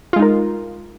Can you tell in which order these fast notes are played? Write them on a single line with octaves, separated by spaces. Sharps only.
F4 G#3 D#4 A#4